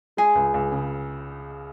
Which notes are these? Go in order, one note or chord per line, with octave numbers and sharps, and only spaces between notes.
G#3 G#4
C#2
C#2
C#3